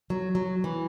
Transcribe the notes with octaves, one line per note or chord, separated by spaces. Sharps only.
F#3
F#3
E3